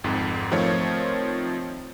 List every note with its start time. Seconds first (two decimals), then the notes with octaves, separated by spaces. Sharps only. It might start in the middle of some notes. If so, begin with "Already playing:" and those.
0.04 G#1 F2 G#2
0.51 D#3 F3 A3 C4 F4 C#5